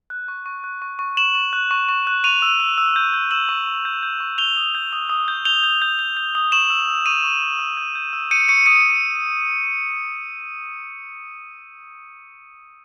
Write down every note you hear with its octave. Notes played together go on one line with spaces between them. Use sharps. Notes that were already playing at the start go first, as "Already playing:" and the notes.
F#6
C#6
C#6
F#6
C#6
C#6
C#6 E7 F#7
C#6
F#6
C#6
C#6
F#6
C#6 D#7 F7
E6
E6
E6
G6
G6
E6 E7 F#7
C#6
C#6
G6
G6
C#6
G6 F7 G7
D#6
G6
D#6
D#6
G6
G6 F7 G7
G6
G6
G6
G6
D#6
C#6 E7 F#7
E6
E6
C#6 D#7 F7
C#6
C#6
E6
G6
G6
E6
G6 C#7 D#7
C#6 C#7 D#7
D#6 C#7 D#7